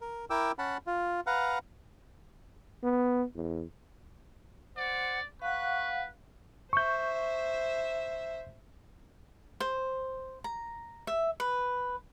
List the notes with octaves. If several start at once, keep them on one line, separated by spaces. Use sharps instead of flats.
A#4
E4 A#4 G5 D6 E6
C#4 F#5 A5 B5
F4
B4 F5 F#5 A#5
B3
E2
C5 D5 F#5
B4 F5 F#5 C#6 F#6
C5 E5 C#6 G6
C5
A#5
E5
B4